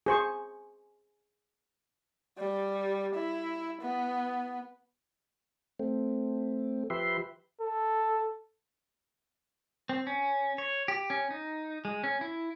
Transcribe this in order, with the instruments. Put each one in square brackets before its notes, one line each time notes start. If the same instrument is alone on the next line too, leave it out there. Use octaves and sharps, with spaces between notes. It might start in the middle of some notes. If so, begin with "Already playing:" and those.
[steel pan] G#4 C5 C#6
[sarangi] G3
E4
B3
[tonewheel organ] A3 C4
F3 G4 B4 E5 C6
[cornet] A4
[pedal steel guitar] C4
C#4
C#5
G4
C#4
D#4
G#3
C#4
E4